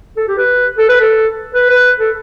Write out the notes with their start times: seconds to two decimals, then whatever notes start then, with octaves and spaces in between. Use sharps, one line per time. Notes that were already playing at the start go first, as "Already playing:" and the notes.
0.17 A4
0.28 G4
0.38 B4
0.78 A4
0.89 B4
1.01 A4
1.55 B4
1.70 B4
2.00 A4